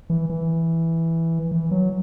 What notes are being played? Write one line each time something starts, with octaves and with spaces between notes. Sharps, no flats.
E3
E3
E3
F#3